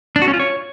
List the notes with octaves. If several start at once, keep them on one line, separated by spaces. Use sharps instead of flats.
D4
F#4
C#4
F4
C#5